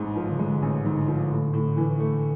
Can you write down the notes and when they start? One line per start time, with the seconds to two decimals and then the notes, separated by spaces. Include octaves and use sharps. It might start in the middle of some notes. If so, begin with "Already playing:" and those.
Already playing: A1 G#2 G#3
0.16 F3
0.29 C#3
0.39 D3 G#3
0.62 A1
0.85 G#2 D3
1.08 F3
1.30 A2
1.53 A2
1.77 E3
1.99 A3